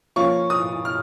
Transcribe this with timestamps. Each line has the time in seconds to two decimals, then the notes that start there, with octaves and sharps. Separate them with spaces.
0.16 F3 A#3 C#4 F4 C#6
0.50 D#6
0.85 F6